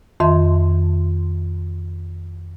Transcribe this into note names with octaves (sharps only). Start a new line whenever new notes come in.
F2 D#3 E5 C6